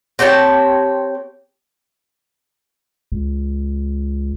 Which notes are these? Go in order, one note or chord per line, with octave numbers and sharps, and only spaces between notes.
C4 G4 C#5 A5
C#2